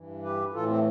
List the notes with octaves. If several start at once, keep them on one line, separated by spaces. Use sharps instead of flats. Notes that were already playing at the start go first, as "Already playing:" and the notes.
Already playing: G2 E3
G4 B4
A2 E3 F4 A4
A3 C4